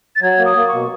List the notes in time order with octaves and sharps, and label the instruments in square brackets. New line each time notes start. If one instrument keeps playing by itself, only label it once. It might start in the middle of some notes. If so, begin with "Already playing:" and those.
[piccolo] A6
[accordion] F#3 [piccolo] G#6
[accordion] A#3
[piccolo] D#6
[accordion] A#3
[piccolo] C#6
[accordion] B2